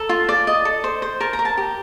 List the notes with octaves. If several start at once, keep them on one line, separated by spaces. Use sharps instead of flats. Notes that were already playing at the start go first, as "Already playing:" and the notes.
Already playing: A4 A#5
F4
D5
D#5
A4
C5
C5
A#4 A5
A#5
A#4
A5
G4